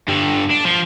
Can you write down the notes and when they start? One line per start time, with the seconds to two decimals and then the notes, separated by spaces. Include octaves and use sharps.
0.08 G2 D3
0.51 D4
0.66 F3